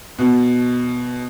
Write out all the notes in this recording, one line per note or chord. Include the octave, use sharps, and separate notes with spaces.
B2